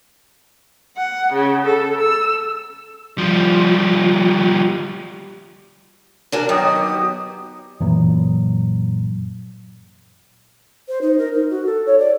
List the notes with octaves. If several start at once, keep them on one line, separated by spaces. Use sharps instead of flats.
F#5
C#3
A4
E6
F3 G3
D4 F#4 A#4 G#5
B2 D#3 F#3 G4 D#6
F#2 A#2 E3 F#3
C5
D#4
A#4
D#4
F#4
A4
C#5
D5